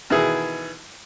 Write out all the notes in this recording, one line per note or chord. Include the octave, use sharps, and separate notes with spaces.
B2 D#3 E3 E4 G#4